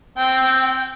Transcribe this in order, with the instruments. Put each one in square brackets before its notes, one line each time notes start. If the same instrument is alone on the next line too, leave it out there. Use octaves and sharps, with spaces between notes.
[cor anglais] C4 [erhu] G5